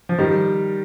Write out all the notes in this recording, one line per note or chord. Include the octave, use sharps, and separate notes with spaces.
F3
D#3 G3